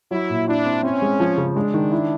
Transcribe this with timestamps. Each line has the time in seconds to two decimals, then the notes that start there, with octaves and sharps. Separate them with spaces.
0.11 F#3 E4
0.30 A#2
0.48 D4 E4
0.66 C4
0.83 C4 C#4
1.02 G#3
1.20 F3
1.38 C#3
1.55 G#3 D4
1.74 D#3
1.92 E4